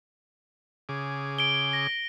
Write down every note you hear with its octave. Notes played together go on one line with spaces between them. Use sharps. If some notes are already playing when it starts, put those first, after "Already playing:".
C#3 G#4 D6
D7 G7
A#6